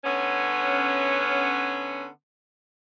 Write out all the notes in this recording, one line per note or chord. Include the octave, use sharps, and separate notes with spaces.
D3 B3 C#4